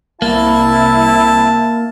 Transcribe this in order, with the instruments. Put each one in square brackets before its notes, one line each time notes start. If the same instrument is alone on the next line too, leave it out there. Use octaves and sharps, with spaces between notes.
[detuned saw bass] C2 [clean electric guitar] A#3 [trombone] E4 [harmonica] A5